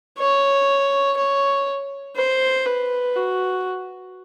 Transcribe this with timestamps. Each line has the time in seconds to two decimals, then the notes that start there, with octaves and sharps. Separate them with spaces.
0.19 C#5
1.17 C#5
2.17 C5
2.66 B4
3.16 F#4